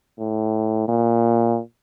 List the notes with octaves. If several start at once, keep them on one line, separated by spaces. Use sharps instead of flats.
A2
A#2